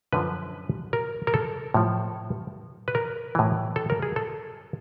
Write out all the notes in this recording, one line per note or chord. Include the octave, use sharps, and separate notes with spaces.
F#2 D3 F3 B4
A#4
A#4
A4
A2 F3
B4
A#4
A2 E3
A4
A#4
G#4
A4